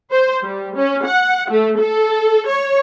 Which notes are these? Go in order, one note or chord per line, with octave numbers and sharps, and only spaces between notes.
C5
G3
C#4
F#5
A3
A4
C#5